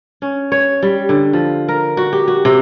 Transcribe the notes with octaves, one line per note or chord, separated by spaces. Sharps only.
C#4
C#5
G3
D3
F3
A#4
F#4
G4
F#4
C3